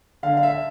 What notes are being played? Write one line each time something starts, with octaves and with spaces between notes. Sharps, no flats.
D3 F5
F5
E5